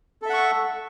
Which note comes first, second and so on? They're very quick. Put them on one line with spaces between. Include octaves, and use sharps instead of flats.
A4 E5 F#5 C#6